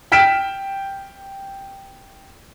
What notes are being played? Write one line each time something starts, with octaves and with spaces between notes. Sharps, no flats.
G5 F6 B6 D7 E7